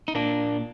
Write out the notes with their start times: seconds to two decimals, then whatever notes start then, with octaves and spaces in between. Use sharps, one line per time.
0.08 D#4
0.15 A#2 A#3 D4